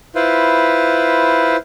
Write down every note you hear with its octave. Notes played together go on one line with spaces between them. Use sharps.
E4 F4 B4 C5